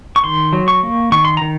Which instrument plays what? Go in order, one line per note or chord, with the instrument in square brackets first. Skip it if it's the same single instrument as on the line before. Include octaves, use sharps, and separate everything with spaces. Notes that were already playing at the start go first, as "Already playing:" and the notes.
[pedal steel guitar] C#6
D#3 C6
F#3
C#6
A#3
D#3 C#6
C6
D#3 A#5